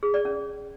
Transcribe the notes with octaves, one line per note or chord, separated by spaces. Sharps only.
G#4
D5
C#4